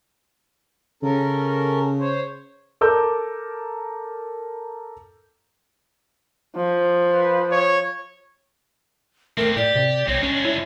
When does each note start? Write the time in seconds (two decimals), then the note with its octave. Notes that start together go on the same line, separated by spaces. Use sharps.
1.03 C#3 C#4 A4 A#4
2.00 C5 C#5
2.81 A4 A#4 D6 E6 G6
6.56 F3
7.13 B4
7.52 C#5
9.37 E3 A3 C4 A#4
9.56 A2 G4 D5
9.75 C3
10.08 B1 C4 D#4 C#5
10.23 G#3 C#4 D4
10.45 E4